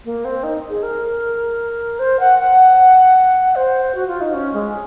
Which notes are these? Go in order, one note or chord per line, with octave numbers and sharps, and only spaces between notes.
A#3
C4
D#4
G#4
A#4
C5
F#5
F#5
C5
F#4
F4
D#4
C#4
G#3